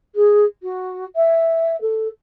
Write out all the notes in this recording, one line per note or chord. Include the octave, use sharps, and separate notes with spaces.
G#4
F#4
E5
A4